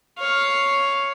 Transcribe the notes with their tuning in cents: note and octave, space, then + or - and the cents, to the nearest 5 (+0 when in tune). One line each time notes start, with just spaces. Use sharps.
C#5 +0 F5 +0